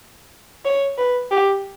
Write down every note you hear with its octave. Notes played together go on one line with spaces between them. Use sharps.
C#5
B4
G4